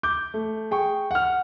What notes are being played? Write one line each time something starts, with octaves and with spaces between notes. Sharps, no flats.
D6 G6
A3
G#4 G5 C#6
F#5 F6